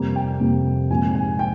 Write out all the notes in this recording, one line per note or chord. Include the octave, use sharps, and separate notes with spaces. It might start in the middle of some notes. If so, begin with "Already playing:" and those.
Already playing: F2 C3 G3 A#3
G5
F2 C3 G3 A#3
A#1 G#2 F3 A#3 G#5
G#5
G5